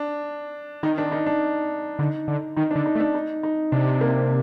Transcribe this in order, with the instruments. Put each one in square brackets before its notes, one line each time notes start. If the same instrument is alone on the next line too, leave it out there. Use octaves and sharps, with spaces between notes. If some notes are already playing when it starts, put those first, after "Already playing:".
Already playing: [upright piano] D4
[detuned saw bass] D#3 [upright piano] D#4
[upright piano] D4
D#4
D4
[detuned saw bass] D3 [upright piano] D#4
[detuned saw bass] D3
[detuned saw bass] D#3 [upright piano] D#4
[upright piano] D4
[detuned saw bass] D3
[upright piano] D#4
[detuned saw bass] A3
[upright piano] D4
D#4
D#4
[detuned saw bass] C3 [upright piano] D4
[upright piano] A#3